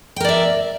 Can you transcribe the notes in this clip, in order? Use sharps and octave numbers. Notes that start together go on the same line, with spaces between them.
A#4 D5 E5 G5